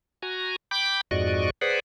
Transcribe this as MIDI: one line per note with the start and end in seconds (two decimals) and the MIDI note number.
0.22 0.56 66
0.22 0.56 80
0.22 0.56 82
0.71 1.01 79
0.71 1.01 83
0.71 1.01 86
0.71 1.01 91
1.11 1.50 41
1.11 1.50 44
1.11 1.50 66
1.11 1.50 74
1.11 1.50 75
1.11 1.50 85
1.61 1.80 68
1.61 1.80 71
1.61 1.80 72
1.61 1.80 74
1.61 1.80 78